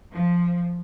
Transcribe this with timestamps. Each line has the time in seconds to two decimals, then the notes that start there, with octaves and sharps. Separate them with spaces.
0.13 F3